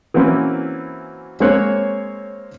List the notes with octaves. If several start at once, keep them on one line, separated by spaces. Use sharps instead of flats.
E3 F#3 A#3 C4 C#4 E4
G#3 A#3 C4 C5 C#5 F#6